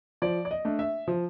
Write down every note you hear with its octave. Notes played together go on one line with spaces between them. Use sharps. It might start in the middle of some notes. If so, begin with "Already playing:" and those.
F3 D5
D5
D#5
A3 D4
E5
F3